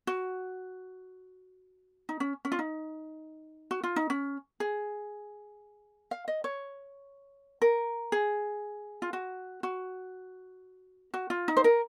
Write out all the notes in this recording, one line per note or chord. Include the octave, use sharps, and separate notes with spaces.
F#4
D#4
C#4
C#4
F4
D#4
F#4
F4
D#4
C#4
G#4
F5
D#5
C#5
A#4
G#4
F4
F#4
F#4
F#4
F4
D#4
C5
A#4